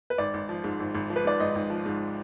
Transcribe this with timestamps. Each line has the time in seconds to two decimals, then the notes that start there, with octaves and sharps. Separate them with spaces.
0.10 B4
0.18 G#1 D5
0.34 G#1
0.49 F3
0.64 G#2
0.80 G#1
0.95 G#1
1.10 F3
1.16 B4
1.25 G#2 D5
1.40 G#1 D#5
1.55 G#1
1.70 F3
1.86 G#2